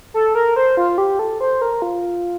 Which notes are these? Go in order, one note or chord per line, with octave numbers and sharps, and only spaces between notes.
A4
A#4
C5
F4
G4
A4
C5
A#4
F4